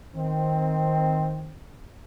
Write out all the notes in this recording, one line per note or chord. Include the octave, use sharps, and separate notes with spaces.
D#3 C4